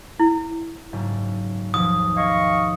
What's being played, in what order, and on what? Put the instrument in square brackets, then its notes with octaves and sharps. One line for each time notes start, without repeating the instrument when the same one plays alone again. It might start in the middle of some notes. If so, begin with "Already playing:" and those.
[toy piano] E4
[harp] F#1 G#2
[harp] D#2 B2 F3 [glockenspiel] D#6
[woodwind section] D#5 F5 C#6